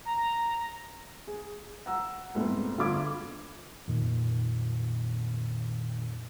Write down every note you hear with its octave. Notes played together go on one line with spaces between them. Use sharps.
A#5
G#4
F#5 A#5 E6
C2 F2 G#2 A3 B3 C4
G1 D3 F4 B5 D6 G#6
F2 A#2 D#3